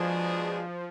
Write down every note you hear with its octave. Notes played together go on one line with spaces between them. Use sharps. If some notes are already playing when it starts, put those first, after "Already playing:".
Already playing: B2 F3 G#3 D4 G#4